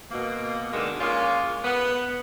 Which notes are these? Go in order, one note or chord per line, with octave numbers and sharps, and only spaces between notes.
B2 A#3
B2 D3 D#3 G#3
G#3 A#3 C#4 F4
B3